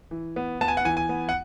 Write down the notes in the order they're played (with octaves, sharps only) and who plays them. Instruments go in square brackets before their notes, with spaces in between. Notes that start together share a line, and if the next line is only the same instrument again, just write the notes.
[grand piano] E3
B3
B3 A5
G#5
F#5
E3 G#5
G#5
B3
F#5